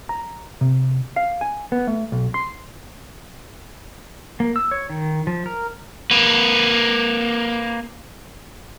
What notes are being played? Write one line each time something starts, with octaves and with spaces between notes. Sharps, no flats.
A#5
C3
F5
G#5
B3
A3
B1
C6
A#3
E6
C#5
D#3
F3
A#4
A#3 B4